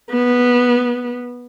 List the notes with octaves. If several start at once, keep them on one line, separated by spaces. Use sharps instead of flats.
B3